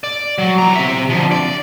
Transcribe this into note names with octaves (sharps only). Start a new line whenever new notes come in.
D5
F#3
E2 A#5
C3 E5
D3 F3
D5